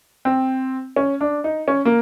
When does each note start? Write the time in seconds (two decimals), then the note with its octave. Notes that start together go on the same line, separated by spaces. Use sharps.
0.25 C4
0.96 C#4
1.21 D4
1.44 D#4
1.68 C#4
1.85 A#3